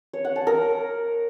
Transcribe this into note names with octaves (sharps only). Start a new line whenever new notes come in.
C#5
F#5
A5
A#4